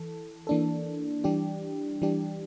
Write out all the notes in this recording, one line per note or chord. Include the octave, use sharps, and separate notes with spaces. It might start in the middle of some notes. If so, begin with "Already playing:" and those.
Already playing: E3 A4
E3 A#3 D4 A4
E3 G3 D4 G4
E3 G3 D4 G4